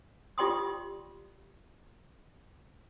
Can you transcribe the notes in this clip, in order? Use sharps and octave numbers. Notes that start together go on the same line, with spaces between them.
F4 G4 D5 G5 C6 D#6